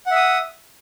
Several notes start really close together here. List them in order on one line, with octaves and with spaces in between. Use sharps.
F#5 E5 D#6